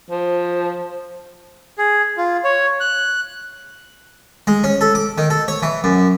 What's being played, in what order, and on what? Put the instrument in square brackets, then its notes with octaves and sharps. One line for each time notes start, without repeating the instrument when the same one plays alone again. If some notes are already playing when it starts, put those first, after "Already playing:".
[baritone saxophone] F3
[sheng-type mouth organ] G#4
F4
C#5
F#6
[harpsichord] G#3
C#4
A4
D6
D#3
A4
C#5
E3
F#2